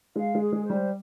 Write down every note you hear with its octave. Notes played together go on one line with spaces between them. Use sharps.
G#3 F5
G#3
G#4
G#3
C5
G3